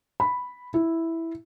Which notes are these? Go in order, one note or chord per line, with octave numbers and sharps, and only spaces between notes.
B5
E4